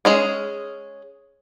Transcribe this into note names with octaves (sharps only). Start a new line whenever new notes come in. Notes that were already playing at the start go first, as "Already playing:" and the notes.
G#3 C#4 G#4